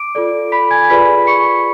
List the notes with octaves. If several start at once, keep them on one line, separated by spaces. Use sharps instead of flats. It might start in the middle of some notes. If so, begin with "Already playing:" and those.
Already playing: D6 D7
F4 A4 D5
B5 B6
G#5 G#6
F4 G#4 B4 D5 B5 B6
C#6 C#7